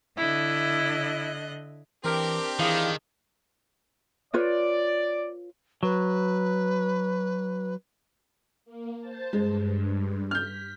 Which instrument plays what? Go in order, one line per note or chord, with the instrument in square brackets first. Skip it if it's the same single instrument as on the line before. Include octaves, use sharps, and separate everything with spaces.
[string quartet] D3 D#5 F#6 [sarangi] E4
[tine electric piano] E3 [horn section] C4 D4 G4 [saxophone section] A#4
[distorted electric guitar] D#3 [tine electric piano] E3 E4 F5 [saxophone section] G#4
[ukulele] F4 B4 C#5 [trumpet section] D5
[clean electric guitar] F#3 [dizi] B4
[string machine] A#3
C5 A5
[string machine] G2 [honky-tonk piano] G#3
[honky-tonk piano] F6 G6 [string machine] B6